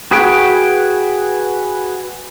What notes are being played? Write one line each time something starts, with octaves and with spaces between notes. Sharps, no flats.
F#4 G#4 B4 F#5 G5